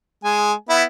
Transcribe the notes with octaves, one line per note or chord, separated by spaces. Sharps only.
G#3 G#5
B3 E4